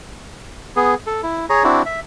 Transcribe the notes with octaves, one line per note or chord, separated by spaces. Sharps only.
B3 G#4
A4
E4
G#4 C#5 A#5
C4 D4 E4 F#4
E5